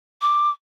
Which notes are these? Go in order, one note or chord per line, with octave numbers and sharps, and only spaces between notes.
D6